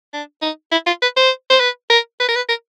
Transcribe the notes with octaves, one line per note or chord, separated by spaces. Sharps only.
D4
D#4
E4
F4
B4
C5
C5
B4
A#4
B4
A#4
B4
A#4